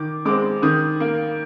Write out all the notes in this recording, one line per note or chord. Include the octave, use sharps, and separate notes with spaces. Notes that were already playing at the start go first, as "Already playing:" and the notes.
Already playing: D#3 D6
G#3 C4 D6
D#3 D#6
A#3